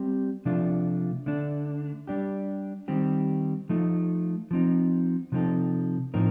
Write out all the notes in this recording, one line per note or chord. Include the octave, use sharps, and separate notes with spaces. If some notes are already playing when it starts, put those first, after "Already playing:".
Already playing: G3 C4 G4
C3 F3 A3 D4 F4
D3 A3 D4
G3 D4 G4
D#3 G3 C4 G4
F3 A3 D#4
F3 C4 D#4
C3 F3 C4 D#4 A4
A2 F3 C4 D#4 A#4